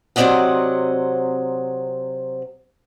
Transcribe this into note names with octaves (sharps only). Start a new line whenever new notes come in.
C3 F#3 C4 D5 D#5 F#5